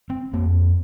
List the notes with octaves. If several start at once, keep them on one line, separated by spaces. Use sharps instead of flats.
C4
F2 A#3